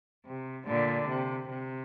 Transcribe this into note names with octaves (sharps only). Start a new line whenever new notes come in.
C3
A#2 D3
C3
C3